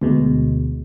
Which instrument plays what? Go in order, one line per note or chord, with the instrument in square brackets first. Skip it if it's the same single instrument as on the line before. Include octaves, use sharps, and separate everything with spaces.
[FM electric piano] D2 B2 G#3